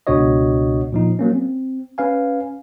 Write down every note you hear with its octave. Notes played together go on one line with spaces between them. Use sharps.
C#2 B2 D4 F#4 C#5 D#5
A#2 F3 D#4
F#3 A#3 C#4
C4
C#4 B4 F5 G#5